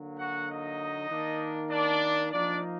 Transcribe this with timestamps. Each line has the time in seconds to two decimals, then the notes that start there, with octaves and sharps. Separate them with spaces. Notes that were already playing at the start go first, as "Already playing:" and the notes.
Already playing: D3 F#3 A#3
0.19 F#4 F#5
0.49 D#4 D#5
1.10 D#3 A#3 D4
1.71 D4 D5
2.30 F3 A#3 D4 D#4 D5